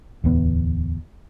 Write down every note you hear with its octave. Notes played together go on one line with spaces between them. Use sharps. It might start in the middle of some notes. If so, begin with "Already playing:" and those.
D1 E2 B3